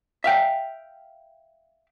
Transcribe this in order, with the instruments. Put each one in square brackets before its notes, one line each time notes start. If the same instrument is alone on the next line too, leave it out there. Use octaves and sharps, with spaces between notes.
[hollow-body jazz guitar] E5 F5 G5